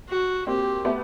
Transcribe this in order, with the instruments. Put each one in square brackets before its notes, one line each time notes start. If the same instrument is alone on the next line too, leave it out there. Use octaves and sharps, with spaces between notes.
[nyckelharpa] F#4
[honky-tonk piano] A#3 C4 [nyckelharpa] G4
[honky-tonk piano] A3 B3